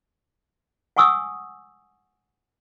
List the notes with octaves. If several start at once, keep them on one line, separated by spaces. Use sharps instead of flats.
F#5 G#5 C#6 D#6 E6